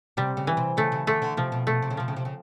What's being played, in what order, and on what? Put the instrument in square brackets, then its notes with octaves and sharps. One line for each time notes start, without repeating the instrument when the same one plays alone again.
[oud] C3 [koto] G3
[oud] C#3
[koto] E3
[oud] C3
[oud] C#3 [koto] A3
[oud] C#3
[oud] D3 [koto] A3
[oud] D3
[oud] C3 [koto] F3
[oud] B2
[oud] B2 [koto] A3
[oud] C3
C#3
[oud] C3 [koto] F3
[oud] C#3
C3
C#3